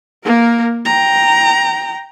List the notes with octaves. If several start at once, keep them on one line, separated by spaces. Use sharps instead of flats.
A#3 A#4
G5 A#5